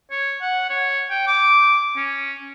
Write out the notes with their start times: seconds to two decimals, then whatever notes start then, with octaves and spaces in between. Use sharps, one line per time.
0.11 C#5
0.41 F#5
0.70 C#5
1.10 G5
1.27 D6
1.96 C#4